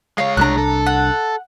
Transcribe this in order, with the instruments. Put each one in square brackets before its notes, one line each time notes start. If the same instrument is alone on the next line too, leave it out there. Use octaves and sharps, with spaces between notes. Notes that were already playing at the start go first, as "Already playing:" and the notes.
[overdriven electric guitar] G#3 C#5 [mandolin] F5
[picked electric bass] C2 G3 D4 [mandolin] A#5 F#6
[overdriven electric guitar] A4
[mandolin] F#5